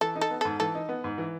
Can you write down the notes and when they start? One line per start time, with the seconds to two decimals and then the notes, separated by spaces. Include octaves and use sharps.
0.01 E3 A4
0.15 D#4
0.21 A4
0.31 B3
0.41 G#2 A4
0.60 E3 A4
0.75 D#4
0.89 B3
1.04 G#2
1.18 E3